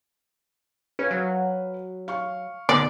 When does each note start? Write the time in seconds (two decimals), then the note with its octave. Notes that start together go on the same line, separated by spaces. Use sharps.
0.99 C#4 B4 F5
1.11 F#3
2.08 F5 C#6
2.69 B1 D3 D5